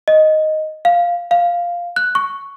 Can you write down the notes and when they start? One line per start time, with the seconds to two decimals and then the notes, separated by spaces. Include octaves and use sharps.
0.08 D#5
0.85 F5
1.31 F5
1.96 F#6
2.15 C#6